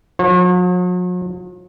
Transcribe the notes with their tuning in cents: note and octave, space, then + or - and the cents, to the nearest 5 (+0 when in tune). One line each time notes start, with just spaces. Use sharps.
F#3 -45 C#5 -40